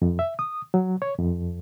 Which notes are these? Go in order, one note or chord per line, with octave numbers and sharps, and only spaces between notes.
F2
E5
D#6
F#3
C#5
F2